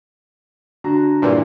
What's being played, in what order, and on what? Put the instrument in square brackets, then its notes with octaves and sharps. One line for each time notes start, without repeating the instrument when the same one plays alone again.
[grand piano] D3 F#4 A#5
[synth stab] G2 A#2 E3